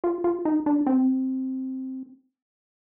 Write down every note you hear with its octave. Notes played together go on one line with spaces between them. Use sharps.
F4
F4
D#4
D4
C4